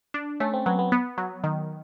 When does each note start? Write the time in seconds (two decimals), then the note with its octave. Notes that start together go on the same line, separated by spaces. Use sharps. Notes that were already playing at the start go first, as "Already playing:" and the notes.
0.14 D4
0.40 A3 C#4
0.54 C4
0.66 F#3 B3
0.79 B3
0.92 B3
1.18 F#3
1.44 D#3